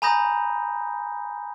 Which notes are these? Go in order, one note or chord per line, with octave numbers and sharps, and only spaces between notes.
G#5 A#5 B5 D#6 G6 A#6